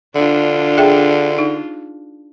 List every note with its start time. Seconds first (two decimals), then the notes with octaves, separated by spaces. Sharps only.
0.15 D3 D4 F4
0.77 G#4 E5 G5
1.39 D#4